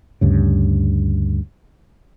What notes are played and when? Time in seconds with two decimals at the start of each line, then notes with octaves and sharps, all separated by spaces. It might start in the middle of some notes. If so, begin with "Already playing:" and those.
0.21 D2 G2 C#3